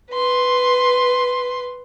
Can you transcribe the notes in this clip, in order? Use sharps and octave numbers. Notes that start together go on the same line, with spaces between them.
B4 C6